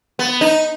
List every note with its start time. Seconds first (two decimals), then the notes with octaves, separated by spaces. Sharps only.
0.19 B3
0.41 D#4